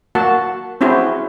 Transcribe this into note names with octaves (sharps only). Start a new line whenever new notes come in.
A#3 F#4 F#5 A5
C4 C#4 E4 F#4 G#4 C5